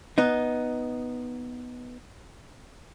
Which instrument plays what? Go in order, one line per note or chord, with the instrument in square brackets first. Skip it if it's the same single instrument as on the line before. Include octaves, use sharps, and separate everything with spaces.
[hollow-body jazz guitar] B3 D#4